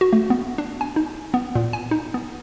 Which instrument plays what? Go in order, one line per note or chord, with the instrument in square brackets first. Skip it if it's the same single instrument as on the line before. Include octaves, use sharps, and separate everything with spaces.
[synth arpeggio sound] F#4
A3
B3
D4
G#5
D#4
B3
A#2
G#5
D#4
B3